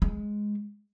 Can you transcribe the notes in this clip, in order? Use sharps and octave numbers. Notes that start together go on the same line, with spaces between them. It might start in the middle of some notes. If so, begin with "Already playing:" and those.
G#3